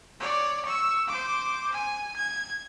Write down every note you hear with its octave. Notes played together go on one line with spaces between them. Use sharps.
C#5 D5
C#6 E6
C5 D6
G#5
G#6